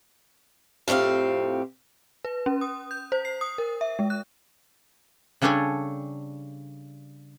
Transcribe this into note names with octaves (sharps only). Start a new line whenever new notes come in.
F2 A2 C4 G4 F5
B4
C#4
D#6
G6
C5
C7
D#6
A#4
E5
G#3
F#6
C#3 G3 D4 A4 C#5 G#5